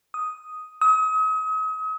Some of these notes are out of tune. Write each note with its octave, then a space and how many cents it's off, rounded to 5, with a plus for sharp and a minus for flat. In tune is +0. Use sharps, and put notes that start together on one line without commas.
D#6 +5
D#6 +40